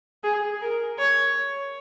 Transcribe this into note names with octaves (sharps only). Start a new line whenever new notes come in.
G#4
A#4
C#5